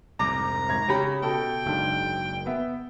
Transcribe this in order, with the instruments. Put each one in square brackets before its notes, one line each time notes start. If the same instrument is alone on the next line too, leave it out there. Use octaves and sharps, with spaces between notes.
[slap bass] C2 F2 G#2 [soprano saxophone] A#5 [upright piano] D6
[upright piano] G#1 G#6
[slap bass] C#3 [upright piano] C#4 G4 B5
[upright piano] B2 A4 [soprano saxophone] G5
[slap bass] F#1 [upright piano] G#2 D4
[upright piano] B3 E5